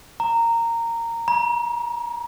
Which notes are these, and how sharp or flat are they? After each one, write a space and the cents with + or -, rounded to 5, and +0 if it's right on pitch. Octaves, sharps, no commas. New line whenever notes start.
A#5 -15
A#5 +40